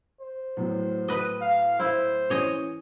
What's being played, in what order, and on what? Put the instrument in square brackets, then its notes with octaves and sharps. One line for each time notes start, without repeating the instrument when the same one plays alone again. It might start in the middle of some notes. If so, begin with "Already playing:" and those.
[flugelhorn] C5
[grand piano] A2 F#3 B3
[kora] B4 D#5
[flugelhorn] F5
[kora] E4 [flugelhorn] C5
[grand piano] E3 C#4 [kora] C#5 D#5